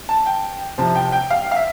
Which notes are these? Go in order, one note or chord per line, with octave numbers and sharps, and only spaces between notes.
A5
G5
C2 C3 F3 A5
G5
G5
F5
F5
E5